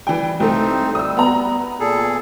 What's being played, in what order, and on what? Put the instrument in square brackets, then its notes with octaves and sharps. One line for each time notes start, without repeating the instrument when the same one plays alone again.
[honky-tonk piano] E3 G5 [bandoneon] G3
[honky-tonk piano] C2 A3 [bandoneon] C4 D#4
[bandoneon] G3 [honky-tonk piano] D#6 E6
[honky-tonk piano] B3 A#5
[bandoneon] A#2 G#4 A4